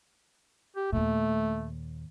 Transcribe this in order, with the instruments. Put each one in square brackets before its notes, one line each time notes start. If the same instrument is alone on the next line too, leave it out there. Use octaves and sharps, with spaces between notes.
[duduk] G4
[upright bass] D#2 A#2 [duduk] A3